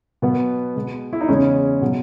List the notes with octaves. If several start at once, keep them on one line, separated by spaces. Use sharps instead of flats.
B2 F#3 B3
B2 G#3
E4
D#4
E2 C#3 G#3 C#4
B2 F#3